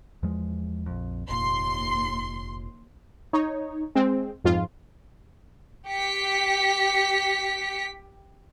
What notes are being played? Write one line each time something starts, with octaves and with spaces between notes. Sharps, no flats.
E2 F3 G#3
A#1 F2
F1 D#2 A#2 C6
D#4 C#5
G#3 C4
F2 G#2 F4
G4 B6 C#7